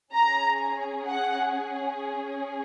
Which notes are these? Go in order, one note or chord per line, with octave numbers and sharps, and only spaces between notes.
C#4 G#4 A#5
F#5